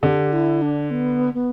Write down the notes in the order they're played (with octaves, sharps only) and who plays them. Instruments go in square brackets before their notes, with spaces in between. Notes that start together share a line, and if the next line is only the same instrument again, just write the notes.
[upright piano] D3 [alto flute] G4
[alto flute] E4
D4
B3
B3